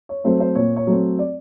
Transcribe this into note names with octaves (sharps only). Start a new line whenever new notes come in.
C#5
F#3 A3 C4 C5
C5
A#2 C#5
C#5
F#3 A3 C4
D5